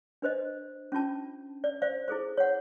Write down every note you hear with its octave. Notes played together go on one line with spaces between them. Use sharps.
D4 B4 C5 D#5
C#4 D4 F4 A5
D5
C5 D5 F5
E4 G#4 A4 C5
C#5 F#5